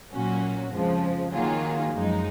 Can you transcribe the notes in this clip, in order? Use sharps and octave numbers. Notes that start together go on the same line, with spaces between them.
A#2 F#3 C#4 F#4
F2 C#3 F3 G#3
D#3 F#3 A#3 F4 G#4
F#2 F3 G#3 D#4